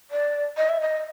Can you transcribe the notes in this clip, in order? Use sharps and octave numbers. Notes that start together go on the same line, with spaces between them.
D5
D#5
E5
D#5